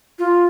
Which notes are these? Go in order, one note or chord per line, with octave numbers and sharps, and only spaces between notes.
F4